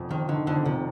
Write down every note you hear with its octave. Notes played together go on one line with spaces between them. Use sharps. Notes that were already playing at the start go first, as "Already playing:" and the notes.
Already playing: F1 F2
F2 D#3
D3 D#3
F2 D3
F1 C3